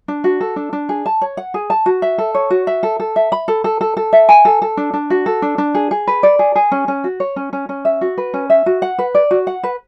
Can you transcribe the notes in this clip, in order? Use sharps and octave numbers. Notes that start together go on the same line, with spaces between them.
D4
F#4
A4
D4
D4
G#4
A5
C#5
F#5
G#4
A5
F#4
E5
A4
C#5
F#4
E5
A4
A4
E5
B5
A4
A4
A4
A4
E5
G#5
A4
A4
D4
D4
F#4
A4
D4
D4
G#4
G#4
B4
D5
G#4
G#4
C#4
C#4
F#4
C#5
C#4
C#4
C#4
E5
F#4
B4
C#4
E5
F#4
F#5
B4
D5
F#4
F#5
B4